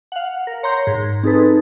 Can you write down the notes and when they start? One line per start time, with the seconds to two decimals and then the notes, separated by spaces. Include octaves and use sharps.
0.12 F5 F#5
0.47 A#4
0.63 C#5 A#5 C6 G6
0.87 G#2
1.23 C4 D#4 G#4 A4 B4